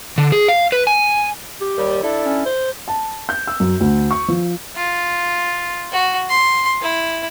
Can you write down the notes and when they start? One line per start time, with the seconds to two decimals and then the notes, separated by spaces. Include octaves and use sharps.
0.18 D3
0.32 G#4
0.48 F5
0.72 B4
0.87 G#5
1.61 G4
1.77 D#2 G3
2.02 D4 E4 A4
2.25 C#4
2.45 C5
2.88 A5
3.29 G6
3.47 E6
3.60 F#2
3.80 D2
4.11 C#6
4.28 F3
4.75 F4
5.92 F#4
6.29 C6
6.82 E4